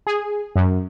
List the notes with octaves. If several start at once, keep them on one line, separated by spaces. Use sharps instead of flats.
G#4
F#2